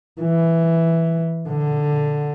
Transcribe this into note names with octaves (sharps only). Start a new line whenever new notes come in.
E3
D3